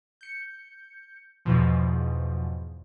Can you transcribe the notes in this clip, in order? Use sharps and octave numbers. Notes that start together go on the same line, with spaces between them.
G6 C#7
E2 G#2 B2 F3